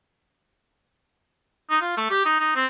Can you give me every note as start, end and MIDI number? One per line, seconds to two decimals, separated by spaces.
1.70 1.78 63
1.81 1.95 65
1.97 2.08 57
2.10 2.24 67
2.26 2.40 63
2.40 2.53 63
2.56 2.66 60